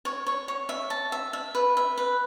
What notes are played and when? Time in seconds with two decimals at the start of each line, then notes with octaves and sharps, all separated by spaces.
0.05 C#5
0.27 C#5
0.48 C#5
0.69 E5
0.90 A5
1.12 E5
1.33 E5
1.55 B4
1.77 E5
1.98 B4